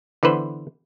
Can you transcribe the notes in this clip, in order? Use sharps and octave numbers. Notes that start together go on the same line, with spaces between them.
D3 E3 B3 B4 C5